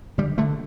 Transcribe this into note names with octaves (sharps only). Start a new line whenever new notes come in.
D3 G3
D3 A3